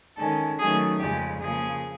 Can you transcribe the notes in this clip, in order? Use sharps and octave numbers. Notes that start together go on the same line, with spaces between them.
D#3 G#3 C#4 A4
D#3 F#3 A3 C#4 G#4
F2 C#3 F3 G#3 G4
C#3 F3 A#3 G#4